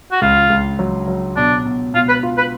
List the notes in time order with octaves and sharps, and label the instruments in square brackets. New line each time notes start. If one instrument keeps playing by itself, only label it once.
[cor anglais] F#4
[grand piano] C#2 [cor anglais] F4
[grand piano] C#2
F#3
F#3
[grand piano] B2 [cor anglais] D4
[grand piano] B2
[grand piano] B2 [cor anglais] F4
[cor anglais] B4
[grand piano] F4
[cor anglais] B4